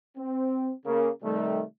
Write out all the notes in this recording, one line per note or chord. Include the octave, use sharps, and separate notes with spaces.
C4
C#3 A#3
C3 D#3 G3 A3